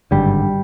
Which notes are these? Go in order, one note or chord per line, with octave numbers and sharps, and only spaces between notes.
G#1 G2 D3 G3